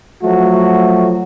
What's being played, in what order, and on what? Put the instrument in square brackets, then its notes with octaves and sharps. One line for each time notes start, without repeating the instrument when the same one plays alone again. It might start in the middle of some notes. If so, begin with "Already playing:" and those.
[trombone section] F3 F#3 A3 F#4